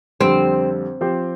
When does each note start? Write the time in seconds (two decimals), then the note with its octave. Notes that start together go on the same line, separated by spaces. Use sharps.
0.21 F2 D3 G3 C4
1.01 F3 C4 G4 C5